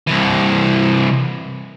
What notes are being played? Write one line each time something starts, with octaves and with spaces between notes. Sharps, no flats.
C2 E3